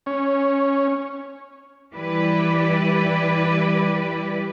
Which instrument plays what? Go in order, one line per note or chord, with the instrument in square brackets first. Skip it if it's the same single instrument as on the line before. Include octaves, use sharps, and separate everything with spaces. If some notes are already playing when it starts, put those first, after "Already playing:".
[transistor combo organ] C#4
[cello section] E3 G3 E4 G4 B4 D5